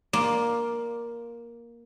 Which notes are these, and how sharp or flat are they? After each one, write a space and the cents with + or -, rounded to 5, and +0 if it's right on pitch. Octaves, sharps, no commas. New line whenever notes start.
A#3 +10 F4 +5 D5 +0